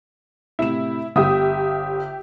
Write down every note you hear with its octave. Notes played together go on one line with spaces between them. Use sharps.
A2 C3 E4 E7
G1 G4 E5 D#6